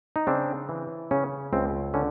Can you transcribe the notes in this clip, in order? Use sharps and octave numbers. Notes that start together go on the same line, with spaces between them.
D#4
C#3 C4 D4
E3
C#3 C#4
C#2 C4
D3 C#4